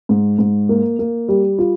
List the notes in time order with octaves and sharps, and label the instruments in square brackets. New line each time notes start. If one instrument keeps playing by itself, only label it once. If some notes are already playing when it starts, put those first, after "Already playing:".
[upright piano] G#2
G#2
A#3
A#3
G3
F4